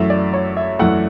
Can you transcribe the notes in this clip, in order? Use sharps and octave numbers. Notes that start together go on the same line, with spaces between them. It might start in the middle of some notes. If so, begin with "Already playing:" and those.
Already playing: F#2 E3 A3 E5
D5
C#5
E5
F#2 E3 A3 F#5